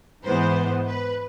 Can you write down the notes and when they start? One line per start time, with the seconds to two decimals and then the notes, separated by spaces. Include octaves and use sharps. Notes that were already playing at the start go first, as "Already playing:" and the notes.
0.24 G#2 E3 G#3 B3 C5
0.87 B4